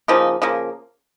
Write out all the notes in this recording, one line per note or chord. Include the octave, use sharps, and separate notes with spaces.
C#3 F3 A#3 D#4
C#3 F3 A#3